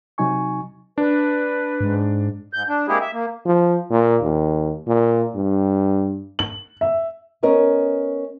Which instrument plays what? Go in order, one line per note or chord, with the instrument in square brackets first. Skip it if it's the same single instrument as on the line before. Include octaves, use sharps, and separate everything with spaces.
[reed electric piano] C3 F#3 D#4 G#5 C#6
[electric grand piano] D4 [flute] B4
[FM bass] G#2
[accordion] G#2 G6
D4
G#3 A#3 C4 E4 G4 G#4
E5
A#3
[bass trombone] F3
A#2
D#2
A#2
G2
[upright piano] F#7
E5
[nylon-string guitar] B3 C#4 A#4 D#5